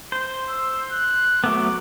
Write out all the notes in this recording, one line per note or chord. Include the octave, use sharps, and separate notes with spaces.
C5
E6
F#6
F#3 A3 B3 D6